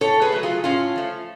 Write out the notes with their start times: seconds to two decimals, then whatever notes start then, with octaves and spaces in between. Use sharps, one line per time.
0.01 A2 A4 C#5
0.21 G#4 B4
0.32 F#3 A3
0.43 F4 G#4
0.64 A2 C#4 F4
0.96 F3 A3